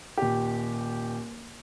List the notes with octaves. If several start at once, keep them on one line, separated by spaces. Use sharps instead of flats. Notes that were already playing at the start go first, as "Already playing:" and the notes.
D#1 G4